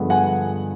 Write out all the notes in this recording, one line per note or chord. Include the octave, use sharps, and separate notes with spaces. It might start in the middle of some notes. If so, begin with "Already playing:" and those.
Already playing: G2 D3 F3 G#3 B3
F#5 G#5